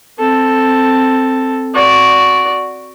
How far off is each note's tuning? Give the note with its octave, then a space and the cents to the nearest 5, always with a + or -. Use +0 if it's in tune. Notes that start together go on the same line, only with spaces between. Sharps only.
C4 +0 A4 +0
F#4 +0 D5 -15